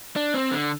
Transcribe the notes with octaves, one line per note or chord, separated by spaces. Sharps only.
D4
C4
D3